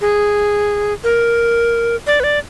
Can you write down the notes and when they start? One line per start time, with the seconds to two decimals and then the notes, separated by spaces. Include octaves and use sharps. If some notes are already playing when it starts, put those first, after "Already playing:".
0.01 G#4
1.04 A#4
2.07 D5
2.20 B4
2.24 D5